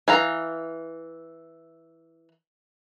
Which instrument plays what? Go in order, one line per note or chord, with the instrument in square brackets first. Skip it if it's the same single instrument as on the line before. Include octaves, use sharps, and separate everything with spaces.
[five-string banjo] E3 F5 A#5